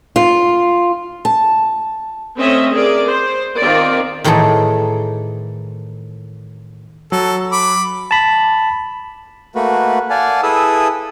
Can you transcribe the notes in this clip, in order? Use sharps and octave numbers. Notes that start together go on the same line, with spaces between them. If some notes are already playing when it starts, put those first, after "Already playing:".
F4
A5
A3 C4 C#4 D#5 E5
G#4 A#4 D5
C5
D#3 C4 F4 A#4 D5
A2 D#3 E3 G#4 A4 A#5
F#3 A4
B5 D6
A5 B5
A3 A#3 F#4 B4
D5 F5 F#5 G#5 A5
E4 G#4 A4 B4 D#6 E6